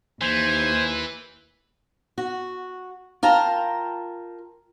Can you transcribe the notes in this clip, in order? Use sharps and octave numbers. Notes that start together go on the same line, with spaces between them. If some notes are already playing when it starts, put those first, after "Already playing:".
D#2 E3 C5 G#5
F#4
F4 A#4 G5 A5 A#5